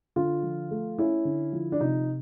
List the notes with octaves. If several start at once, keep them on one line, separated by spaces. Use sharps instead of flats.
D3 F4
F3
A3
C#4 E4
D3
F3
D4
C3 D#4